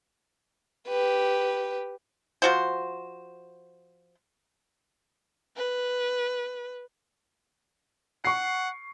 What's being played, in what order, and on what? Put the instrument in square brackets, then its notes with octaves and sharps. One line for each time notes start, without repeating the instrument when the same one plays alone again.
[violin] G4 B4
[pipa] F3 F#4 C5
[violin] B4
[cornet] F#5 [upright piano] C#6 C7